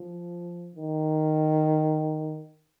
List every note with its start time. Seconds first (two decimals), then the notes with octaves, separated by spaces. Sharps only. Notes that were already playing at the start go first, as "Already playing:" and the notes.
Already playing: F3
0.76 D#3